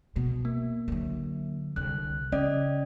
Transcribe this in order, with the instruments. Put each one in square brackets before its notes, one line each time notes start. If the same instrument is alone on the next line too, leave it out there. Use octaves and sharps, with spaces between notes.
[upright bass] B2
[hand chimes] A#3
[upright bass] D3 F#3
[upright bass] C2 D3 [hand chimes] F#6
[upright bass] C#3 [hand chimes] C#4 D5 D#5